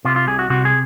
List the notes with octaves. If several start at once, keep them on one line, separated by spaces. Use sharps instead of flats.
C3 F4
F4
C2 G#4
F#4
C3 F#4
G#4